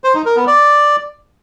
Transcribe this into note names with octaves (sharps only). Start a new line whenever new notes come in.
C5
D#4
A#4
B3
D5